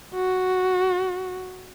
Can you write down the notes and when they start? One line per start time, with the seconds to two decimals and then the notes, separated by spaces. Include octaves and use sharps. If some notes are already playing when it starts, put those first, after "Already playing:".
0.14 F#4